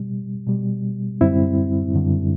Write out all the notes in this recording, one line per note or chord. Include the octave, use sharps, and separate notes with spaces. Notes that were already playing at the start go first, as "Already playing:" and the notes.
Already playing: B2 G3
B2 G3
F#2 D3 G3 C4 E4
F#2 D3 G3